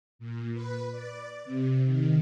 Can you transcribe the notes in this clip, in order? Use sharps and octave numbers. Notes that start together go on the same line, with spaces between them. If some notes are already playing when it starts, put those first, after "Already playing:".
A#2
B4
D5
C3
D#3